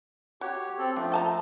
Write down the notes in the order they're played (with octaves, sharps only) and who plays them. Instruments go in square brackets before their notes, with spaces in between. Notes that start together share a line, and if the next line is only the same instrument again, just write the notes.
[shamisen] F#4 [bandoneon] G4 C#5
[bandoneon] C4 A4
[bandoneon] F3 A3 [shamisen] D4
[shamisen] G5 A5 A#5